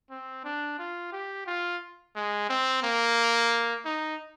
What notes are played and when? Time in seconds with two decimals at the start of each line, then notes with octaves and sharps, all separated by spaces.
0.10 C4
0.44 D4
0.79 F4
1.12 G4
1.46 F4
2.16 G#3
2.49 C4
2.83 A#3
3.85 D#4